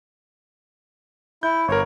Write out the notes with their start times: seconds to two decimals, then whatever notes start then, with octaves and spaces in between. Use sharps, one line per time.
1.43 E4 G6
1.68 G1 A#4 C#5